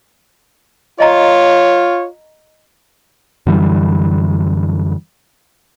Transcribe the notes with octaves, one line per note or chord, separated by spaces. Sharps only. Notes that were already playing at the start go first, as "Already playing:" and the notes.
F4 C#5 D#5 A#5
F#2 D3 E3 G3